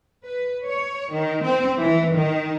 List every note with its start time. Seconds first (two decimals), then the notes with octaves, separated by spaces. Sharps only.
0.25 B4
0.66 C#5
1.11 D#3
1.44 C4
1.80 E3
2.15 D#3